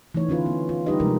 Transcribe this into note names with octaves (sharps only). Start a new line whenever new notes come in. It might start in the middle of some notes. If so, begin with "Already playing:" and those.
E3 A3 D#4 C#5
D3 C#4 F4 B4
B3
F4
G3 D4 D#4 G4 B4 D#5
C3 F3 G#3 A3 A#4